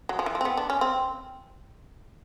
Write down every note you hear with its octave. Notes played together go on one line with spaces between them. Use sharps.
F#3
F3
E3
F3
C4
B3
D4
C#4
C4